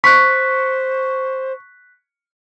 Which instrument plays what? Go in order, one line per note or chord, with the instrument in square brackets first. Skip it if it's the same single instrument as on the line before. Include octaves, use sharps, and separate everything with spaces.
[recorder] C5 [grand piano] C#6 [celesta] F#6 B6